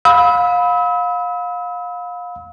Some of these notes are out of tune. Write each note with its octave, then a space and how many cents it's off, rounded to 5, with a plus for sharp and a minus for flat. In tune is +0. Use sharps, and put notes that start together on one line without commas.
F5 +30 B5 +0 E6 -40